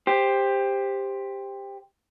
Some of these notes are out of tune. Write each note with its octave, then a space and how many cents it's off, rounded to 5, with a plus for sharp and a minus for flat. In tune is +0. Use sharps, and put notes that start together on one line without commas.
G4 +15 C5 +0